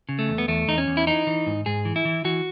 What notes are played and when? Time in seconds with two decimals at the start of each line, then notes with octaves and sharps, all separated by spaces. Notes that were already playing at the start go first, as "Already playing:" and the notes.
0.09 C#3
0.19 A3
0.29 E2
0.38 B3
0.48 E2 A3
0.68 E2 D#4
0.78 C#4
0.88 E2
0.97 E4
1.07 E3 D#4
1.27 E3
1.46 G#2
1.66 G#2 G#4
1.85 E3
1.96 E4
2.05 E3
2.25 E3 F#4